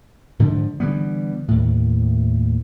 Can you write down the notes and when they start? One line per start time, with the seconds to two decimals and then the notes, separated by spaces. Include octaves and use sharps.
0.39 G#2 D3 F3
0.80 D3 E3 G3 B3
1.48 D#2 A2